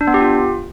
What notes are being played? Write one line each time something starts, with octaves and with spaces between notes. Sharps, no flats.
D4
B3
G4
F4